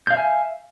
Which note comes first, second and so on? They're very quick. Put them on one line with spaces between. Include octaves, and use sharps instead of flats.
G6 F5 E5 G#5